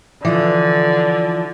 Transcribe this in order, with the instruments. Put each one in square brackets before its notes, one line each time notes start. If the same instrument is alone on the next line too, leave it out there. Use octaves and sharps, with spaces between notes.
[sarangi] D3 [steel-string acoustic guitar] E3 F3